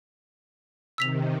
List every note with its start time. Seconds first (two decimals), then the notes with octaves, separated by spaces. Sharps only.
0.98 C3 D#3 E6 B6 F7